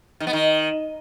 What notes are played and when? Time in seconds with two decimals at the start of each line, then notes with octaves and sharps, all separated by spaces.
0.20 D#3
0.27 B3
0.33 D#3